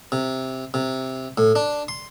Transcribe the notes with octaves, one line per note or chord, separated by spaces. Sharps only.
C3
C3
A2
D4
C6